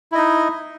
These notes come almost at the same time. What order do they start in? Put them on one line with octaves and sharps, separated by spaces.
E4 D#5 D#4